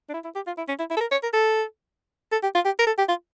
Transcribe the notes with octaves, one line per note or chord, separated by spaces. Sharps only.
D4
E4
E4
G4
F4
E4
C#4
E4
E4
A4
A#4
C#5
A#4
A4
A4
G4
F4
G4
A#4
A4
G4
F4